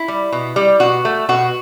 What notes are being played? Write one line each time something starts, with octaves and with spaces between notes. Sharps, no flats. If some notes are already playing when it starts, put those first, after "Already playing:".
Already playing: E4
G3
B2
G3
B2 F#4
A3
B2 F#4